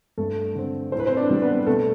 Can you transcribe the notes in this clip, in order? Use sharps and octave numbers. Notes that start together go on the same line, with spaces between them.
G2 A3 A4
D3 A3 C4
A2 C5
B4
C4 C5
D4 D5
G3 C4
B3 B4
B2 A3 A4